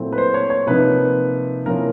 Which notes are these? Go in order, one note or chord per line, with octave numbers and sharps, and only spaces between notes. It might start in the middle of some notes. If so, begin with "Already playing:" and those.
Already playing: A#2 F#3 A3 C4 E4
B4
C5
C#5
C#5
C3 F3 A#3 D#4 B4
C3 F3 A#3 C#4 E4 A#4